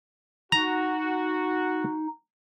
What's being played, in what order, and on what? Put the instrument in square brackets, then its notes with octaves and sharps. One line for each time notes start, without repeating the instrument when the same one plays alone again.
[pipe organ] D#4 [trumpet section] F#4 [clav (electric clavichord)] A#5